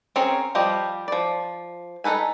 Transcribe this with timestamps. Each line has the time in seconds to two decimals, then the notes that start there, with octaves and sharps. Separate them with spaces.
0.16 C4 C#4 G#4 A#4 C#5
0.55 F3 G3 F4 G4 D#5
1.08 F3 D5
2.04 D#4 G#4 A4 B4 G#5